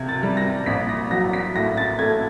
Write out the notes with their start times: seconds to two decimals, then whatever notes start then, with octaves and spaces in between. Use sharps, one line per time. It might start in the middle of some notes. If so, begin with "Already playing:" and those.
Already playing: C3 G#6
0.09 A6
0.23 G3
0.37 A#6
0.66 A#1 B6
0.89 A#6
1.11 F#3 A#6
1.33 B6
1.56 A2 A#6
1.77 A6
1.99 A3 G#6